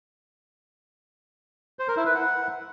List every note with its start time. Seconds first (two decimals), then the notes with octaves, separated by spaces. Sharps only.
1.79 C5
1.88 A#4
1.97 E4
2.06 B4
2.15 F#5